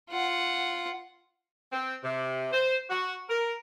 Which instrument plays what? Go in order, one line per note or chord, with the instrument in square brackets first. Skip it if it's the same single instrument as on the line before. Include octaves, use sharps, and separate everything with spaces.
[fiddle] F4 F#5
[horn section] C4
C3
C5
F#4
A#4